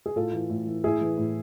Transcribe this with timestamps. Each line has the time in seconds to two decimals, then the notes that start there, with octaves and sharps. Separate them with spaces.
0.06 G#4
0.16 A2 F4 A4
0.33 E3
0.50 A2
0.67 E3
0.84 A2 E4 G#4
1.01 E3
1.18 A2